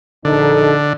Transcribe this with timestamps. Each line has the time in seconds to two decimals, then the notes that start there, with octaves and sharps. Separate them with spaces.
0.25 A#1 D3 D#4 A4